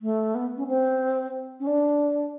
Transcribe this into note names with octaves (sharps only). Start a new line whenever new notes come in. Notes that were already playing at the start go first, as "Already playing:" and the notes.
A3
B3
C#4
C4
C#4
D4